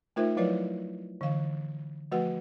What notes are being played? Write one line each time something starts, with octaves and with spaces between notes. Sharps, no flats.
A3 D#4 F4 A#4 C5 E5
F3 F#3 E4 B4 C#5 D5
D3 E3 F5
F3 A3 F#4 B4 F#5